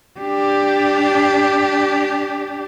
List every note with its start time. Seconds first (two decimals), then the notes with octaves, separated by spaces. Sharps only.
0.21 D4 G4